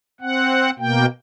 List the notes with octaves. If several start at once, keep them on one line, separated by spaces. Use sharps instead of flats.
C4 F#5
B2 A#3 G5